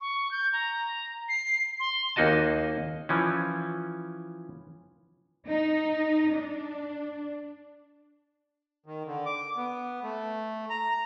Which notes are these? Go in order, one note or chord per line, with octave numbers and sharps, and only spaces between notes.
C#6
G6
A#5
C7
C6
D#2 A#3 D#4 F#4 D#5 A5
E3 F3 C#4
D#4
D4
D#3
D3
D6
B3
A3
A#5